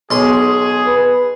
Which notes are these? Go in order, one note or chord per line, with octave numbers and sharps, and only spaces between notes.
B1 G#4 C6
B4